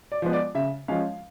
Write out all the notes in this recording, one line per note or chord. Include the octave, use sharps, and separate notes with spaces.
D5
F3 G#3 B3
D5
C#3 E5
F3 G#3 C#4 F5